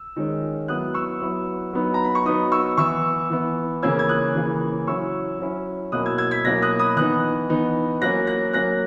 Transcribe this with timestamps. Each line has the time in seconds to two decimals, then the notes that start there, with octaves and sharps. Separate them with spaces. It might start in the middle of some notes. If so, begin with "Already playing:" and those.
Already playing: E6
0.16 D#3 G#3 C#4
0.68 F#3 B3 E4 D#6 F#6
0.94 C#6 E6
1.21 F#3 B3 E4
1.73 F#3 B3 D#4
1.94 A#5
2.05 B5
2.15 C#6
2.26 F#3 B3 D#4 B5 D#6
2.52 C#6 E6
2.77 E3 B3 E4 C#6 E6
3.30 E3 B3 E4
3.83 C#3 E3 A#3 C#4 E6 G#6
3.99 G#6
4.09 D#6 F#6
4.35 C#3 E3 A#3 C#4
4.87 F#3 C#4 E4 C#6 E6
5.40 F#3 C#4 E4
5.92 B2 F#3 A#3 C#4 E4 D#6 F#6
6.06 E6 G#6
6.18 E6 G#6
6.31 G#6 B6
6.44 B2 F#3 A#3 C#4 E4 F#6 A#6
6.62 D#6 F#6
6.79 B5 D#6
6.96 E3 B3 D#4 D#6 F#6
7.50 E3 B3 D#4
8.01 F#3 A#3 C#4 F#6 A#6
8.27 F#6 A#6
8.53 F#3 A#3 C#4 F#6 A#6